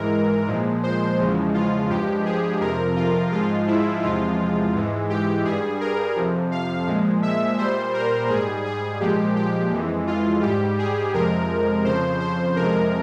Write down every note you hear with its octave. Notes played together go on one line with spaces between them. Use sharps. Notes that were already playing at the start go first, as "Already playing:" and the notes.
Already playing: G#2 E3 G#3 A#4
A#2 F3 G#3
C5
E2 C#3 F3 G#3
F4
G2 F3 G#3 G4
G#4
F2 C3 F3 A#4
F4
G#2 F3 G#3 F4
E4
E2 C3 F3 G#3 F4
G#2 E3 G#3
G4
G2 G3 G#4
A#4
F2 C3 F3
F5
A#2 F3 G#3
E5
A#2 G3 C5
A#4
G#2 G3 G#4
G#4
A#2 F3 G#3 G4
G4
F2 E3 G#3
F4
G#2 G3 G4
G#4
F2 C3 F3 G#3 A#4
F2 C#3 F3 C5
C5
F2 C3 F3 G#3 A#4